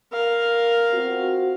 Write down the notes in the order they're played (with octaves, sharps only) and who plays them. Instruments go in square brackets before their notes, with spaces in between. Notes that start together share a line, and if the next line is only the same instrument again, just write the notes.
[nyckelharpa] A#4 F5
[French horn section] C4 F4 F#4